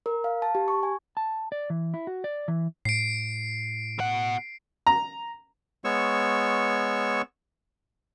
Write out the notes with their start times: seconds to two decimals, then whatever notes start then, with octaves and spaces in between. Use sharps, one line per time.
0.06 A#4
0.24 F5
0.42 A5
0.55 G4
0.68 C#6
0.83 G#5
1.17 A5
1.52 D5
1.70 E3
1.94 E4
2.07 F#4
2.24 D5
2.48 E3
2.85 A2 C7 D7
3.99 B2 F#5
4.87 A#5
5.84 G#3 B3 C#5 C#6 E6